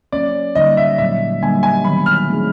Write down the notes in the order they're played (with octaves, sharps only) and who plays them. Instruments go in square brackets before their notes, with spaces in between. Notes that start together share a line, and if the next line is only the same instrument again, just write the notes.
[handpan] F#3 A#3 C#4 [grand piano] D5
[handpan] D3 G3 A#3 D#4 [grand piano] D#5
[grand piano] E5
[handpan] A#2 F#3 A#3 [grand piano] E5
[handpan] D3 G3 A#3 D4 [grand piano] G#5
[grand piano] G#5
[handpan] D#3 F#3 B3 [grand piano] B5
[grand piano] F6
[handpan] E3 A3 C4 D#4 G#4